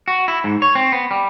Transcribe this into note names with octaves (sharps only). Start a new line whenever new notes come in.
F#4
E4
G#2
C#5
C4
B3
G3